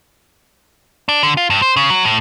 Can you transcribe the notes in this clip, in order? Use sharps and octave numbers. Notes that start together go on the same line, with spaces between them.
D4
D3
F4
G2
C5
C#3
F#3
A2